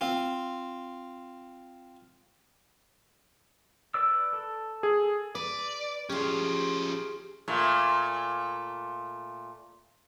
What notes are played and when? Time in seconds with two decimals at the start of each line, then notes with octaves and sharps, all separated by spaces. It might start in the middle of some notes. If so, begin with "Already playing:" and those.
0.01 C4 F4
3.94 B4 D5 E6
4.33 A4
4.83 G#4
5.35 B4 D5
6.09 F3 C#4 G4 G#4
7.48 A#2 A3